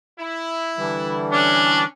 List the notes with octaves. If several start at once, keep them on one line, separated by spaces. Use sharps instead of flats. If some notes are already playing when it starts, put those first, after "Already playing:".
E4
D3 E3 G3
C#4 D4